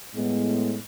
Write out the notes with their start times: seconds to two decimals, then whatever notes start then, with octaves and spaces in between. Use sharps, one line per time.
0.12 A2 G#3 B3